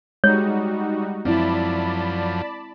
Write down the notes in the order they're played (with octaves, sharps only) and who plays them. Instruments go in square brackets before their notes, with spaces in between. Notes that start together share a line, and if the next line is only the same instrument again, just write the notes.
[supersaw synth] G3 D#4 F#4 [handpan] G#3 [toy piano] C#5
[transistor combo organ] F#2 F3 [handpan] C4 E4 [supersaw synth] D5 A5 B5